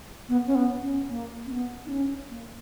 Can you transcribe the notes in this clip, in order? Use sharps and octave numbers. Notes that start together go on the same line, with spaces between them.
B3
C#4
B3
C#4
A#3
C#4
B3
D#4
C#4
A#3